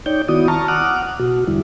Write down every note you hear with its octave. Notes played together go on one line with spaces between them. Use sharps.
D#4 C#5 D5 G5 G6
D#3 B3 E4 F#4 D5 D#6
A5 A#5 C#6 F6
F#5 D6 D#6 F6 F#6
B2 F#4
E2 D3 G3 E4